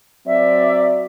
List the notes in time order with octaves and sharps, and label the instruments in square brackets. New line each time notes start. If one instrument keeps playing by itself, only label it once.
[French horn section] F#3 C4 D5 [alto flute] E5